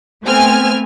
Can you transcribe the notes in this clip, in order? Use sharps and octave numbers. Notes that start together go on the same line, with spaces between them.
A3 B3 C4 G#5 F6